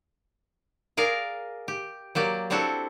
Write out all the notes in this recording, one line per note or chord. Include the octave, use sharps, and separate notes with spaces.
G#4 A#4 D5 F5
G4
F#3 A#3 G4 D5
G3 C4 D4 E4 F#4 A4